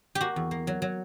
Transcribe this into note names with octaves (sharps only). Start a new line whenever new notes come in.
G4
A#3 F#4
E2
A#3
F#3
F#3